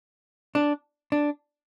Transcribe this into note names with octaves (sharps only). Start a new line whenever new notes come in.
D4
D4